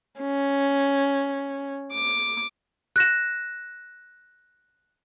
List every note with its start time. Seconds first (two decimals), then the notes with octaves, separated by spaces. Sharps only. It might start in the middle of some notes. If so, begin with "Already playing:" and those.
0.20 C#4
1.93 D6
2.96 F#6 A#6 E7